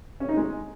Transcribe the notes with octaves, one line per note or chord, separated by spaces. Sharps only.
C#4
D#4
G#3